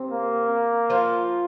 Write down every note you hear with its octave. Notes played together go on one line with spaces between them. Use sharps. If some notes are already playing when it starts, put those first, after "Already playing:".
Already playing: C3 C4
A#3
F3 F4